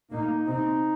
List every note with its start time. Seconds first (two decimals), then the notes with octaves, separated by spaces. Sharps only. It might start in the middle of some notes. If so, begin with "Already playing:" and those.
0.11 A#2 A#3 D#4
0.47 C3 C4 D#4